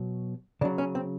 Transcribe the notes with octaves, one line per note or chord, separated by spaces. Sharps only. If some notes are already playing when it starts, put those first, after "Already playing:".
Already playing: B2 F#3
C#3 F#3 D4
C#4
C4